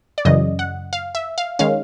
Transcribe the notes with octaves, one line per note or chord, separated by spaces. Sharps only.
D5
F#2 C#3 E3 D#5
F#5
F5
E5
F5
D#3 G#3 C#4 F5